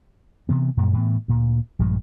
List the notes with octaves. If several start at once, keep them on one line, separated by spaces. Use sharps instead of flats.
C3 E3 B3
F#2 A#2 G3
A2 E3 B3
D2 A#2
A#1 G2 F3 G#3